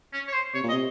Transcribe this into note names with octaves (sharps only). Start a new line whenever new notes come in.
C#4
C#5
C5
C3 C#5
A#2
D#5
C3